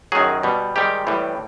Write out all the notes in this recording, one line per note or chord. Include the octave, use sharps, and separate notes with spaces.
F#2 D#3 F#3 G#4
B2 G3
G#2 D#3 G3 G4
A2 E3 G3